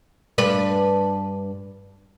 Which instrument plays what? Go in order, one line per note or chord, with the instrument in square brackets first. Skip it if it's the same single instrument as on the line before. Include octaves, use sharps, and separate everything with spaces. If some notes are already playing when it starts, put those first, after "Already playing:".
[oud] G2 D4 B4